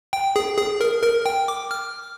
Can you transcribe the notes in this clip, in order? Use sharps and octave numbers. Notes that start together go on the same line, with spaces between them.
G5
G#4
G#4
A#4
A#4
G5
D6
F6